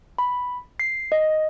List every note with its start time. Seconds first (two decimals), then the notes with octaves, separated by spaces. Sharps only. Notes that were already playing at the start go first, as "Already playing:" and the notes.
0.18 B5
0.80 C7
1.12 D#5